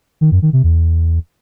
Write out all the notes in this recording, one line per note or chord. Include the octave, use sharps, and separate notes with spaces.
D#3
F#2
D#3
C3
E2